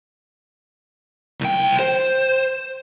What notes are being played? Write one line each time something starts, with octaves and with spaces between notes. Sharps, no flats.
C2 G5
C5